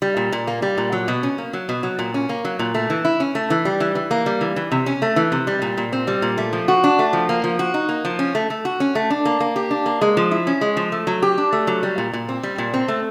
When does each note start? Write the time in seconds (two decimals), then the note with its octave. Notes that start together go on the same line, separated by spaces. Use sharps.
0.02 G3
0.17 A#2
0.32 A#2
0.47 A#3
0.62 G3
0.78 A#2
0.92 F#3
1.08 B2
1.23 C#4
1.38 A#3
1.53 F#3
1.69 B2
1.83 F#3
1.99 A#2
2.14 C#4
2.29 A#3
2.45 F#3
2.59 A#2
2.74 A3
2.90 E3
3.05 E4
3.20 C#4
3.35 A3
3.50 E3
3.65 G3
3.80 E3
3.95 E3
4.11 A#3
4.26 G3
4.41 E3
4.56 E3
4.72 C3
4.86 C#4
5.02 A3
5.16 E3
5.32 C3
5.47 G3
5.62 A#2
5.77 A#2
5.93 C4
6.07 G3
6.22 A#2
6.38 A3
6.53 F3
6.68 F#4
6.84 D4
6.99 A3
7.13 F3
7.29 A#3
7.44 F3
7.59 F#4
7.74 D#4
7.89 A#3
8.05 F3
8.19 C#4
8.35 A3
8.50 A3
8.65 F#4
8.80 C#4
8.95 A3
9.11 D4
9.25 A#3
9.40 A#3
9.56 G4
9.71 D4
9.86 A#3
10.01 G#3
10.17 F3
10.31 E4
10.47 C#4
10.61 G#3
10.77 F3
10.92 A3
11.07 F#3
11.22 G4
11.38 D4
11.52 A3
11.67 F#3
11.83 G3
11.98 A#2
12.13 A#2
12.29 C4
12.43 G3
12.58 A#2
12.74 C4
12.88 A3